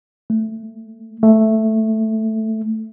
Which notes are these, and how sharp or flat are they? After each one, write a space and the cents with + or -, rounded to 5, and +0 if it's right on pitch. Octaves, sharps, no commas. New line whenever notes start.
A3 +5
A3 +0